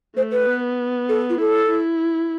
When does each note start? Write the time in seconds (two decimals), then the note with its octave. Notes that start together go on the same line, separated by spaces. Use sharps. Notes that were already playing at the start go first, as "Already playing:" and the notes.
0.16 A3 C5
0.31 B4
0.47 B3
1.08 A4
1.29 F4
1.38 E4 A4
1.69 E4